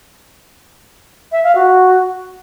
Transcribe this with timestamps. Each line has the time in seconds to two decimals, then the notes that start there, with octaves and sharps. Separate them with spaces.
1.32 E5
1.44 F5
1.55 F#4